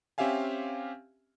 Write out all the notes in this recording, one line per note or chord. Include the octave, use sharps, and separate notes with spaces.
C4 C#4 G4 E5 F5 G#5